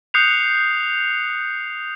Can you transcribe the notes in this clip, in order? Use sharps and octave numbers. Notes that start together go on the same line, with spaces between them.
D#6 F#6 G6 C7 C#7 F7